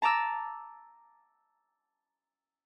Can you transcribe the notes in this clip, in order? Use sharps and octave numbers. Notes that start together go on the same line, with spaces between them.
A5 A#5 D6 E6